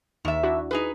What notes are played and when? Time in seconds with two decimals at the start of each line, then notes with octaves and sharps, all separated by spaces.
0.25 D#2 D#3 E5
0.43 D4 E4 F#4
0.71 D#4 G#4 B4